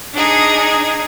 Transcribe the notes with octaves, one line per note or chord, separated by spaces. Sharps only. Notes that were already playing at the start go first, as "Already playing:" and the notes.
D4 D#4 G#4 A#5